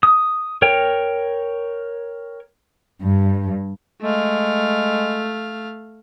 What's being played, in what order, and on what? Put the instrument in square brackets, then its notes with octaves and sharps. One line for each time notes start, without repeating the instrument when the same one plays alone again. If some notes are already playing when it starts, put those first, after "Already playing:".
[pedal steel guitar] D#6
A#4 C#5 G5
[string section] G2
[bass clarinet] G#3 [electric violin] A3 F5